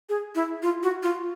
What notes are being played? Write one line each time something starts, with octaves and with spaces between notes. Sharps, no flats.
G#4
E4
F4
F#4
F4